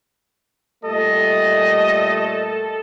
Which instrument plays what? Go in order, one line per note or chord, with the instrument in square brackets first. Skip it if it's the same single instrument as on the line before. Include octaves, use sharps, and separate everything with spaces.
[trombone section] A#2 G3 A3 [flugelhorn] A4 [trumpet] D#5